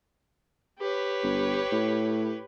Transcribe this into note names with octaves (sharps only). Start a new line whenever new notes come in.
G4 B4 C#5
G1
A2